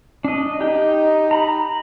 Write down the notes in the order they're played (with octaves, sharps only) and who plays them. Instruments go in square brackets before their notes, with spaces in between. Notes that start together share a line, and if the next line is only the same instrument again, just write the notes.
[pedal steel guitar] D4 D#5
[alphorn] D#4 [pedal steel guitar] G4 G5
[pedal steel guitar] A#5 B5